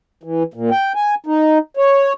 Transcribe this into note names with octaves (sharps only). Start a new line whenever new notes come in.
E3
A#2
G5
G#5
D#4
C#5